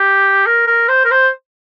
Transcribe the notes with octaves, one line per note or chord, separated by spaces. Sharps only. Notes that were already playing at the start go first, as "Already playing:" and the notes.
Already playing: G4
A#4
A#4
C5
A#4
C5